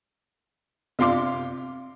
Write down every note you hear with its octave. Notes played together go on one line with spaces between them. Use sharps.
C3 F4 C6 D6